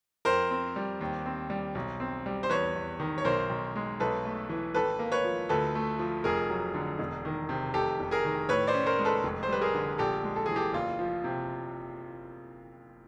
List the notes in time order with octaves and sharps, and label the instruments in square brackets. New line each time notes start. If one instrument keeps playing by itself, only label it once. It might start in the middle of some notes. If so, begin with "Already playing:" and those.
[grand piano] F2 A#4 C5
C4
G3
D#2
C4
G3
B1
C4
G3
C5
E2 B4 C#5
E2
D#3
C#5
B1 A#4 C5
B1
G#3
B1 A4 B4
A3
E3
G#1 A4 B4
A#3
B4 C#5
F3
D2 A4 B4
A3
F3
F1 G#4 A#4
F#3
D3
E1
D#3
C3
F1 G4 A4
F1
G#4 A#4
D#3
A2 B4 C#5
C5 D5
C#4
A#4 C5
G#3
A4 B4
F1
C5
G3 B4
G#4 A#4
D3
A#1 G4 A4
G#3
A4
E3 G#4
G4 A4
F#1 F4
F3
C3